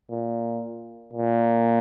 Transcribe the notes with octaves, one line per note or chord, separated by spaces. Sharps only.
A#2
A#2